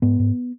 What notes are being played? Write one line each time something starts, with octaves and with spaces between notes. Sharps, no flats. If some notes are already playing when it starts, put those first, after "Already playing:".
G#2 B3
G#2